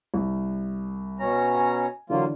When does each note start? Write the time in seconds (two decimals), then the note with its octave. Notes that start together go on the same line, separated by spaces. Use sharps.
0.14 C2
1.19 B2 C#4 A#5
1.55 G#5
2.10 D3 E3 F#3 A#3 F4